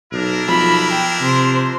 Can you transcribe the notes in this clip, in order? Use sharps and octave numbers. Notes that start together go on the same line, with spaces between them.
B1 D4 E4 A#4
B1 F3 B5
G5
C3 C5